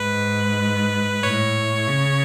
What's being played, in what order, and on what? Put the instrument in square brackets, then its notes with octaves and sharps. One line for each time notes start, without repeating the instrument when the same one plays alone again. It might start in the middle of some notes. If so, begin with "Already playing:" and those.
Already playing: [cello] G#2 [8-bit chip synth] B4
[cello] A2 [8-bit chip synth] C#5
[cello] C#3